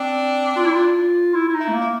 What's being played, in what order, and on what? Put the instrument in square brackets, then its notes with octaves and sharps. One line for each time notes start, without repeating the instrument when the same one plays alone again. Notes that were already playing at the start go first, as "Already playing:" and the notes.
Already playing: [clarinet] C4 [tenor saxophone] D4
[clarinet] F4
E4
F4
E4
E4
D#4
[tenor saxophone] E4
[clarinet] A3
A#3
[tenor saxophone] E4